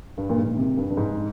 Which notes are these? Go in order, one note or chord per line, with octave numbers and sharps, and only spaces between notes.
G2
A#2
G#2
C3
G2
G2
G#2